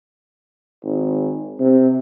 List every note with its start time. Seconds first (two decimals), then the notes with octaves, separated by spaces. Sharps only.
0.83 G#1
1.60 C3